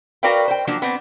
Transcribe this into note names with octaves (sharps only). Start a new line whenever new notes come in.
F#4 A#4 B4 D5 F5 G5
C5 G5
F3 F#3 A#3 D4
B3 C4 D4